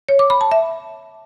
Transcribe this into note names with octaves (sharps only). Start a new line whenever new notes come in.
C#5
D6
B5
A5
E5